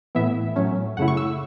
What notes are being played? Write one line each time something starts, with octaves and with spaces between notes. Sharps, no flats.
A2 E3 B3 E4 E5
A2 F#3 A3 C#4
F#2 C#3 A3 E4 F#5
C#6
E6